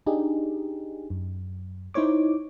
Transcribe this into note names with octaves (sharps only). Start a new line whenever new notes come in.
D4 D#4 G4 G#4
F#2
D#4 E4 C5 C#5 D6